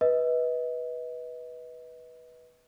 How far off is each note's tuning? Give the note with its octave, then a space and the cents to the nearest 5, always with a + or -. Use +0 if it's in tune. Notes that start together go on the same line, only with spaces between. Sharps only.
B4 -10 D#5 +30